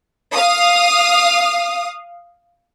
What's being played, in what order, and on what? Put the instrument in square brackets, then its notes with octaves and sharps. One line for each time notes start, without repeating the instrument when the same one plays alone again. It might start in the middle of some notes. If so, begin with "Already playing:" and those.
[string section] F5 D#6